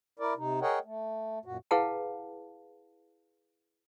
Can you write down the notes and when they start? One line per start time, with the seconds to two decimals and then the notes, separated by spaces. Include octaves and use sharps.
0.19 E4 A#4 D5
0.37 C3 D#4
0.61 G#4 A#4 C#5 D#5 F#5 G5
0.84 A3
1.45 F#2 A#2 F#4
1.71 E4 G#4 B4 F5 F#5 A5